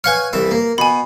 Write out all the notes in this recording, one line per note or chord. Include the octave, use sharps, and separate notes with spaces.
B4 C#5 F5 F#5 G#5 F6
C2 E3 E5
A#3
B2 G#5 B5